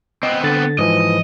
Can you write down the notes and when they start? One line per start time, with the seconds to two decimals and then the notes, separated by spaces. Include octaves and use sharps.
0.23 B3 C4 D#5
0.44 D3 A6
0.79 G#2 E3 F3 D#5